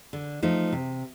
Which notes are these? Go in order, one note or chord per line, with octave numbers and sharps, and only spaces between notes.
D3
F3 A3 D#4
C3